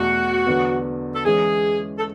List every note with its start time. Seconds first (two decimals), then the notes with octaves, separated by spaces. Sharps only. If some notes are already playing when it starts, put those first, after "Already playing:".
Already playing: E2 B2 A3 F#4
0.47 E2 D3 F#3 B3
1.15 A4
1.25 E3 G#3 C#4 G#4
1.98 A4